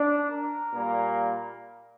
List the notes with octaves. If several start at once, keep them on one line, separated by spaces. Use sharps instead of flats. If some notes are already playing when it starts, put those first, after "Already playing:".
Already playing: D4
A#4
A#2 G3 A#3